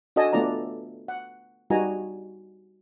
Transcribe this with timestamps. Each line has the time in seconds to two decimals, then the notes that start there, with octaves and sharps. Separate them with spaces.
0.16 D4 F#4 A4 D#5 G#5 A5
0.33 A3 B3 D4 F4 D5 A#5
1.08 F#5
1.70 G3 D#4 F#4 G#5 A#5